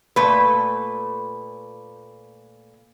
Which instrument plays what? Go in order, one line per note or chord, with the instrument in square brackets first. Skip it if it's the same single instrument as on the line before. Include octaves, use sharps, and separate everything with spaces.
[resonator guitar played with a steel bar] A#2 A3 B4